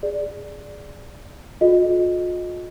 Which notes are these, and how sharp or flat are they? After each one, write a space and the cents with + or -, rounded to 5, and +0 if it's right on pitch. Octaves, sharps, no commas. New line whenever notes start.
G#4 +0 D5 +0
F4 +45 A4 -45 D#5 +0